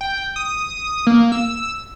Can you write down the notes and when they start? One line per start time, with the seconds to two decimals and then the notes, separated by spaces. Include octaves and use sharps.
0.01 G5
0.36 D#6
1.07 A#3
1.32 E6